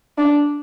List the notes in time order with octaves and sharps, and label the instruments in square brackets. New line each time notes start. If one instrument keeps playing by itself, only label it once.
[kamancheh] D4